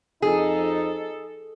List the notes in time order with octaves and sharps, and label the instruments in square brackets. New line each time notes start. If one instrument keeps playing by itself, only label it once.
[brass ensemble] F2 D#4 [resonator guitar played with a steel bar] G#4 [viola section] A4